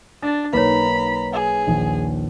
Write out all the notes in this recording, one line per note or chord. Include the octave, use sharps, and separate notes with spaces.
D4 A6
B1 A#3 D#4 B4 C#5 A#5 B5
G#4
A#1 D#2